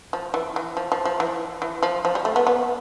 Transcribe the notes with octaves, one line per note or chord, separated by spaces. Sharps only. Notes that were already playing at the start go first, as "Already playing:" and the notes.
F3
E3
E3
F3
F3
F3
E3
E3
F3
F3
G3
A3
B3
B3